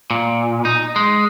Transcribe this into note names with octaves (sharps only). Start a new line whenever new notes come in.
A#2
D#4
G#3